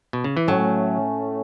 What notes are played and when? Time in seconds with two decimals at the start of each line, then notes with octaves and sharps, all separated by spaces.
0.13 B2
0.24 C#3
0.37 E3
0.47 A2 F#3 A3 C#4